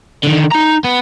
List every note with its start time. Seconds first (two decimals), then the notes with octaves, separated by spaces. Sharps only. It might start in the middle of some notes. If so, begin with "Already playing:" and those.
0.23 D3 D#3
0.51 D#4 A#5
0.84 B3